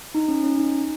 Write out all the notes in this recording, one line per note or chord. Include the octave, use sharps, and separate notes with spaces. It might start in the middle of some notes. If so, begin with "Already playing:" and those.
D#4
C#4
C#4
D#4